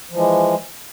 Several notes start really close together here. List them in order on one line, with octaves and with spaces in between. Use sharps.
F3 E3 G#3